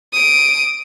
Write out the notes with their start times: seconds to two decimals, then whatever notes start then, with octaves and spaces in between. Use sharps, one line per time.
0.13 D#6 D7